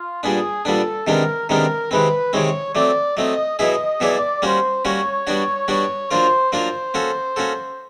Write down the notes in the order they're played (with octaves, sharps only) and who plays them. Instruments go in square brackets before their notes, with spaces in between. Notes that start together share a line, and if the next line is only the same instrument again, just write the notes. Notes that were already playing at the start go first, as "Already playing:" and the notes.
Already playing: [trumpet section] F4
[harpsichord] A#2 G3 B3 D4 [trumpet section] G#4
[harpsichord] A#2 G3 B3 D4 [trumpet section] A4
[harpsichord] C3 D#3 G#3 B3 D4 [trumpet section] A#4
[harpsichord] C3 D#3 G#3 B3 D4 [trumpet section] A#4
[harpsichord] C3 D#3 G#3 C4 [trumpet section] B4
[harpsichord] C3 D#3 G#3 C4 [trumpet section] C#5
[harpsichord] F#3 A3 C4 [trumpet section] D5
[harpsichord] F#3 A3 C4 [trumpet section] D#5
[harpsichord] B2 F#3 B3 E4 G#4 [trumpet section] D#5
[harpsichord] B2 F#3 B3 E4 G#4 [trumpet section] D5
[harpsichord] G3 A#3 C#4 F#4 [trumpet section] C5
[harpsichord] G3 A#3 C#4 F#4 [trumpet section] C#5
[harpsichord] G3 B3 D4 F#4
[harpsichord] G3 B3 D4 F#4 [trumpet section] C#5
[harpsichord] F#3 A#3 D4 F4 A#4 [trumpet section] C5
[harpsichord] F#3 A#3 D4 F4 A#4 [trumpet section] C5
[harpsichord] A#3 C#4 F#4 A4
A#3 C#4 F#4 A4